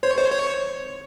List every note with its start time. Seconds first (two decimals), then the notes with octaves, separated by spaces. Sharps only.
0.03 C5 C#5
0.18 C5 C#5
0.31 C#5